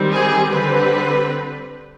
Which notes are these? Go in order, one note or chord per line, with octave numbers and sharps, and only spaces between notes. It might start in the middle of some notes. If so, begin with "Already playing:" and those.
Already playing: D#3 G3 C4
G#4
D3 G3 C4 B4